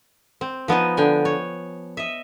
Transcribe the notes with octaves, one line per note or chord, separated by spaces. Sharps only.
C4
F3 B3 D#4 D#5
D3 G5 G#5
C#5
D#5 E5